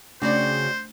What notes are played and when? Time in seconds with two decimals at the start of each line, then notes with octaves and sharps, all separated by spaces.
0.22 C#3 A3 C4 D4 F#4 C5 D5 D6